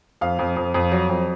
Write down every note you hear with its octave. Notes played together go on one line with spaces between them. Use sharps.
F2 F5
F2
F2
F2
F#3
F2